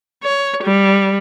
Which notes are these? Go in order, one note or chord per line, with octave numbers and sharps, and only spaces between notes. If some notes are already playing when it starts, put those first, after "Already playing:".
C#5
G3